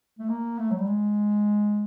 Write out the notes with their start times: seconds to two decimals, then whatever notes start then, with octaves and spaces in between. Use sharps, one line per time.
0.19 A3
0.30 A#3
0.59 A3
0.71 F#3
0.78 G3
0.87 G#3